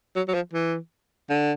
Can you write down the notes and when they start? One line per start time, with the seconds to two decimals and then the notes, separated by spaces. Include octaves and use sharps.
0.16 F#3
0.28 F#3
0.34 F3
0.53 E3
1.30 D3